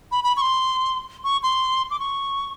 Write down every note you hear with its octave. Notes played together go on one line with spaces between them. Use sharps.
B5
B5
C#6
C6
C#6
C6
D6
C#6